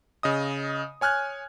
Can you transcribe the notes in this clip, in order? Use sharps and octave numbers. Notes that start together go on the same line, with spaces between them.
C#3 D#5 D#6
C#5 G#5 F6 F#6 G#6